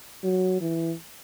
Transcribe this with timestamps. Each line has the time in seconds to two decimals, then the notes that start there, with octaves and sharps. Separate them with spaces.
0.24 F#3
0.61 E3